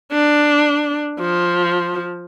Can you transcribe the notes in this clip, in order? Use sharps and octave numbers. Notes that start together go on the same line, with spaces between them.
D4
F3